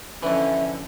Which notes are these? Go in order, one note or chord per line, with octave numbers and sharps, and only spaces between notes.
F2 D3 E3 C#4 E5